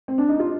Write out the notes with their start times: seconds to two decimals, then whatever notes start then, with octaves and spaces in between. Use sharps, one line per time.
0.08 C4
0.18 D4
0.29 D#4
0.39 F4